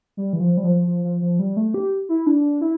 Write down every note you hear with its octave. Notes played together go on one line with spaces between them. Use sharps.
G3
E3
F3
G3
F3
F3
F3
F3
G3
A3
G4
E4
D4
E4